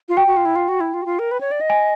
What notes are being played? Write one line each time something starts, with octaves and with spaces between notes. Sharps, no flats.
F4
F#4 G5
F#4
F4
E4
F4
F#4
E4
F4
F#4
F4
A#4
B4
C#5
D5
D#5
G#5